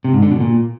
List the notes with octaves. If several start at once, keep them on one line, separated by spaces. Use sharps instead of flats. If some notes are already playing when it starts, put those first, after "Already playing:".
C3
G#2
D3
B2
A#2